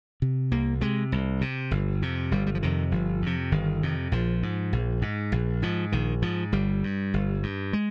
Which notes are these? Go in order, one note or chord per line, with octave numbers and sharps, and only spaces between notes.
C3
C2 A#3
C3 G#3
C2
C3
G1
F2 C3
G1 G3
G3
F3
F2 C3 D#3
G1 F3
F2 C3
G1 D#3
F2 C3
A#1 F3
G#2
A#1
G#2
A#1
G#2 F3
A#1 D#3
G#2 F3
G1 G3
G2
G1
G2
G#3